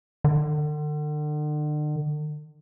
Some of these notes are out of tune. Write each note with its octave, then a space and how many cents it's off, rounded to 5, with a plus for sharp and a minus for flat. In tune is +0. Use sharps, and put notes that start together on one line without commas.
D3 +40